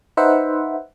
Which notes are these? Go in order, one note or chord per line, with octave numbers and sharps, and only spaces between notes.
D#4 B4 C5 E5 F#5